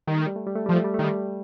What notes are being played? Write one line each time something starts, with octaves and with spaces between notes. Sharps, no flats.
D#3 G3
A3
G3
A3
G3
A3
F3 G3
A3
G3
D#3 A3
G3